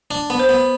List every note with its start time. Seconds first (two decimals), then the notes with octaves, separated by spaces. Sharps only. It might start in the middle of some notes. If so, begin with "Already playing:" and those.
0.11 D4
0.30 B3
0.39 C5
0.49 B3